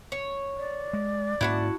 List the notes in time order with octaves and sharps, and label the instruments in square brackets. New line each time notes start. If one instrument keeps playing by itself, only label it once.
[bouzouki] C#5
[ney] D5
[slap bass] G#3
[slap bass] G#2 A#3 C#4 [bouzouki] E4 F#4 A5